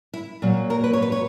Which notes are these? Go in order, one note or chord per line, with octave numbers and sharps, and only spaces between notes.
E4
A#2 F#3 A#3
A#4
B4
C#5
B4
C#5